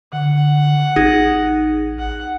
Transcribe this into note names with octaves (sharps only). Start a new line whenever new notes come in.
D3 F#5
A1 D#4 G#4
F#5